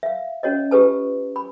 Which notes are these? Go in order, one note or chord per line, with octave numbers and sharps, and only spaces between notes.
E5 F5
C#4 F#4 C#5 D#5
F4 G4 A4 B4 A5
B5